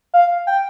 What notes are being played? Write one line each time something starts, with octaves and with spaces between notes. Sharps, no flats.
F5
G5